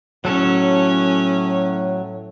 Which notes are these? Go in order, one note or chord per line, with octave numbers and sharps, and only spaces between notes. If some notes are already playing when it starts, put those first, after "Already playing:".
A2 F#3 C#4 A4